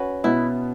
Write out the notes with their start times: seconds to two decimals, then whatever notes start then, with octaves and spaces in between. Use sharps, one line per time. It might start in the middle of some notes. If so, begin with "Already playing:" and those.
Already playing: C#4 F#4 B4
0.24 B2 B3 E4